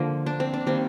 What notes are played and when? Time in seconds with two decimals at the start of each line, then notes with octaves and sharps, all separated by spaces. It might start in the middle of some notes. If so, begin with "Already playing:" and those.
Already playing: D3 F3 A#3
0.26 D4
0.40 C4
0.54 D4
0.67 D#3 G3 A#3 C4